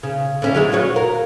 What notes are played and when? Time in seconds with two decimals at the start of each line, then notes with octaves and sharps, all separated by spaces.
0.03 C#3
0.42 D3 C#4 E4
0.54 F#3 G#3 E4
0.72 F4 F#4 C#5
0.96 A#4